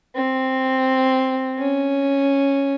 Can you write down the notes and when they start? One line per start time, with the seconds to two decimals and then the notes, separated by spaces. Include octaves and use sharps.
0.15 C4
1.58 C#4